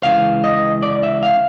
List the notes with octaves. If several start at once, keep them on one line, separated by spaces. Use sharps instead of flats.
C#2 C#3 E3 F5
D#5
D5
E5
F5